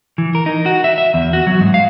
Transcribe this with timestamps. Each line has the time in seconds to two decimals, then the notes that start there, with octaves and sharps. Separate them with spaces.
0.18 E3
0.35 A#4
0.46 D#4
0.66 F#4
0.84 E5
0.98 E5
1.14 E2
1.33 F#4
1.47 F#3
1.60 G#2
1.74 F5